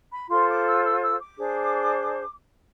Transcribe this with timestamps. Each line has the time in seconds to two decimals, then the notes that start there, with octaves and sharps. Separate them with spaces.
0.11 B5
0.29 F4 A4 C5 C6
0.47 D6
0.65 E6
0.83 E6
1.01 E6
1.19 D6
1.38 D4 G#4 C5